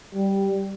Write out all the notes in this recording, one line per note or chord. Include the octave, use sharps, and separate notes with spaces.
G3